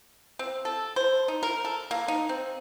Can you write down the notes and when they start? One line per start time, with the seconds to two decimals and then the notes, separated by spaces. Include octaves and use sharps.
0.39 C4
0.65 A4
0.96 C5
1.28 D#4
1.43 A#4
1.65 A4
1.91 A#3
2.08 D#4
2.29 C4